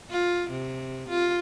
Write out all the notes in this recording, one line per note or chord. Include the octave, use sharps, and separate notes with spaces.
F4
C3
F4